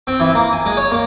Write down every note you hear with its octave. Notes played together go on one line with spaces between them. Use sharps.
C4
E3
A#3
G#5
G#3
C#5
A#3